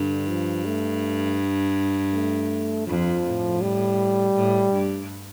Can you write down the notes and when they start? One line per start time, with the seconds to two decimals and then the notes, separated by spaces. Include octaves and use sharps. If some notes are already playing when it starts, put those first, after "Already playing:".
Already playing: G2 D3
0.28 F3
0.65 A3
2.13 A3
2.87 F2 F3
3.24 A2
3.61 G3
4.35 A2
4.72 G2